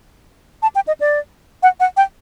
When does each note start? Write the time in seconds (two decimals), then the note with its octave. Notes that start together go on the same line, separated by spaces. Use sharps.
0.62 A5
0.75 G5
0.87 D#5
1.00 D5
1.63 F#5
1.80 F#5
1.97 G5